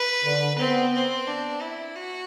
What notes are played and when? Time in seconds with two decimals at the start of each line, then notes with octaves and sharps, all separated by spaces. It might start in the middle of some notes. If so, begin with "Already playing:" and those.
Already playing: B4
0.24 D3
0.58 B3 C4
0.93 C4
1.27 D4
1.61 E4
1.95 F#4